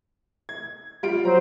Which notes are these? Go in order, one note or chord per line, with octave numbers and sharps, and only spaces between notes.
G#6
G3 F4 D7
F#3 C5 A#5